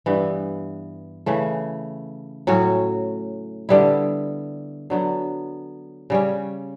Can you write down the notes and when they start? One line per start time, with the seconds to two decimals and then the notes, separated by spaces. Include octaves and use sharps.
0.06 G2 E3 B3 E4
1.26 C#3 E3 A3
2.47 A2 F#3 C#4 F#4
3.69 D3 G3 B3 E4
4.90 D3 F#3 B3
6.10 C#3 G3 C#4